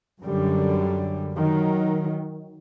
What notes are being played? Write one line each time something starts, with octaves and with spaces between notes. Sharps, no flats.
F#2 D3 G3
D#3 F#3